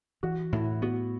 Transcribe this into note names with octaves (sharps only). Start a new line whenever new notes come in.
E3 F#4
A2 E4
B3 F#4